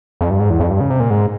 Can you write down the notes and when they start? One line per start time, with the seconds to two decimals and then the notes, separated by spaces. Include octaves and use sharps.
0.21 F2
0.31 G2
0.40 G#2
0.50 E2
0.60 F2
0.71 G2
0.81 C#3
0.90 C3
1.00 A#2
1.10 G#2